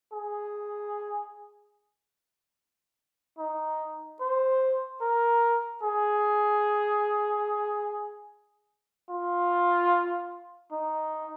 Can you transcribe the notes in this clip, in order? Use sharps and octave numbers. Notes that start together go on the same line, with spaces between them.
G#4
D#4
C5
A#4
G#4
F4
D#4